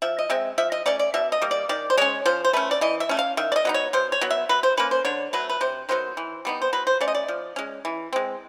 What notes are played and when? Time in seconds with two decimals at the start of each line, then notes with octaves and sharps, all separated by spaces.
0.02 F3 E5
0.19 D#5
0.30 G#3 C4 E5
0.58 F3 E5
0.72 D#5
0.86 A3 C#4 D5
0.99 D5
1.14 B2 E5
1.32 D#5
1.42 G3 A#3
1.51 D5
1.69 D#3 D5
1.90 C5
1.97 G#3 C#4 C#5
2.26 F3 C5
2.45 C5
2.53 A3 C#4 B4
2.71 D5
2.81 E3 D#5
3.00 E5
3.09 A3 C#4
3.19 F5
3.37 D#3 E5
3.52 D5
3.56 D#5
3.65 F#3 B3 D#4
3.74 C#5
3.93 B2 C5
4.12 C#5
4.21 F#3 B3
4.30 E5
4.49 F#3 B4
4.63 C5
4.77 A#3 C#4 B4
4.91 C5
5.05 D3 C#5
5.33 F#3 A3 B4
5.50 B4
5.61 C3 C5
5.89 D#3 F#3 B3 C5
6.17 E3
6.45 G3 B3 D#4
6.62 C5
6.73 F#3 B4
6.87 C5
7.01 A3 C#4 D5
7.08 D#5
7.15 D5
7.28 F3
7.56 G#3 C#4
7.85 E3
8.13 G#3 C4